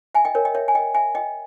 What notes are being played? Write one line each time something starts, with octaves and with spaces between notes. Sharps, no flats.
E5 G#5
D#5 G5
A#4 C#5
D#5 G5
C#5 E5
G#5
D#5 G5
E5 G#5
D#5 G5